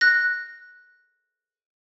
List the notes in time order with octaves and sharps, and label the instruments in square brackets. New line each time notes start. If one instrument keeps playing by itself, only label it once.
[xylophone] F#6 A#6